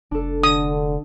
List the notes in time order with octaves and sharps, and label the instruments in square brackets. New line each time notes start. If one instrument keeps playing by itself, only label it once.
[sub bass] F1 [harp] D4 A4
[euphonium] D3 [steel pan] D#6